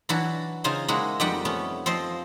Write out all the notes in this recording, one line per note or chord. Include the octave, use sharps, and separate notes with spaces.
E3 F#3 D4 E4 F#4
C#3 D#4 F4 C5 G#5
G#3 A#3 D#4 E4 F#4
F2 G3 D#4 G4 F#5 G5
A3 B3 C#4
F3 C4 C5 D#5 C6